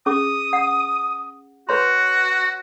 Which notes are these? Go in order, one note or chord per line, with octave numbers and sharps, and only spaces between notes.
C#4 G#4 D6 D#6
F#5
F#4 B4 C#5 C6